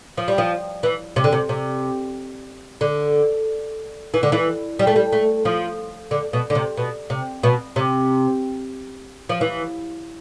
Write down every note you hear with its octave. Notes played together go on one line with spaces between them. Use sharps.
F3
G3
F3
E3
C3
D3
C3
C3
D3
E3
D3
E3
G3
A3
G3
A3
F3
D3
B2
D3
C3
B2
C3
B2
C3
F3
E3